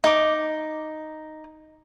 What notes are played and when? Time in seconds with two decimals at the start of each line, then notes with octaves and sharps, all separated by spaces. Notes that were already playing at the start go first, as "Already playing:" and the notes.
0.04 D#4 D6